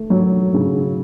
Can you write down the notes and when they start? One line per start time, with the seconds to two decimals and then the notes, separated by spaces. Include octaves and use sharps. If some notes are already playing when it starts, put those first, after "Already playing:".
Already playing: A3
0.10 F#3
0.54 C#3